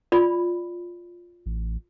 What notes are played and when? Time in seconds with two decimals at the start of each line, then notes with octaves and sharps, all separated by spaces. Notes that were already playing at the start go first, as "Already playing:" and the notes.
0.12 F4 D5 B5
1.46 A1